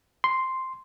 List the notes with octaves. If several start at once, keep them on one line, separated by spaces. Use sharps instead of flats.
C6